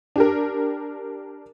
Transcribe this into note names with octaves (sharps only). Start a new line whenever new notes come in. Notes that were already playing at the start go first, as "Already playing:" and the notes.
D4 G4 A#4